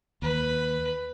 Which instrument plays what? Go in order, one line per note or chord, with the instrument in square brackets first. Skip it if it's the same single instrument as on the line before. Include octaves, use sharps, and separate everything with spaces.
[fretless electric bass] D#2 [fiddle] B4